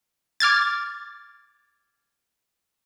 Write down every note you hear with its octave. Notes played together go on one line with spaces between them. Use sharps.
D6 F6 G#6 A6